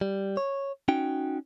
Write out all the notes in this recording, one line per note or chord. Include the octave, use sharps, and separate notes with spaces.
G3
C#5
C#4 D#4 F#4 G5